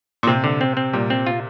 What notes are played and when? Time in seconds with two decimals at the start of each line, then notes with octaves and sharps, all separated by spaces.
0.23 A#2
0.27 C3 C4
0.44 D3
0.61 C4
0.77 C4
0.93 A#2 G3
1.10 C4
1.27 F4